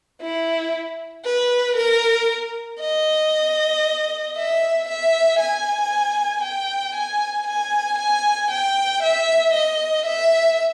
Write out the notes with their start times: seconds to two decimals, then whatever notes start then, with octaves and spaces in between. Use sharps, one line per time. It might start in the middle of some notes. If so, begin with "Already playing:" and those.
0.22 E4
1.25 B4
1.76 A#4
2.81 D#5
4.36 E5
4.88 E5
5.39 G#5
6.43 G5
6.95 G#5
7.47 G#5
7.98 G#5
8.51 G5
9.03 E5
9.53 D#5
10.06 E5